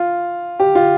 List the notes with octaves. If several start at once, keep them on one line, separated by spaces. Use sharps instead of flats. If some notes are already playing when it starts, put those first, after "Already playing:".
Already playing: F4
G4
F4